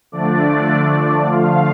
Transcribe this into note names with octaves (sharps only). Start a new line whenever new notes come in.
D3 F3 A3 D4 D5
D3 F3 A3 F4 F5